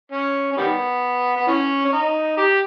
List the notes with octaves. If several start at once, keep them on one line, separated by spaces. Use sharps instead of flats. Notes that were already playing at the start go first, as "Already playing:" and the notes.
C#4
C#4
D#3 G3 B3
B3
E3 C#4
C#4
D#4
G4